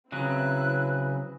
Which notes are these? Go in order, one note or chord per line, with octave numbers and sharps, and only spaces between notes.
C#3 F#3 C4 E4 B4 F#6